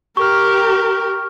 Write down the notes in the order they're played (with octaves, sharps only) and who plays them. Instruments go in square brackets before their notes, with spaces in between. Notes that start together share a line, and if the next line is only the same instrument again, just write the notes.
[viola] G4 A#4 [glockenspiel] C#6 F6